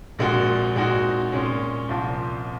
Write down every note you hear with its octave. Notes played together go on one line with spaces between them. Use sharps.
A#1 A#2 G#3 C4 F#4
A#2 G#3 C4 D#4 F#4
A#2 G#3 C#4
C2 A#2 F3 C4 F4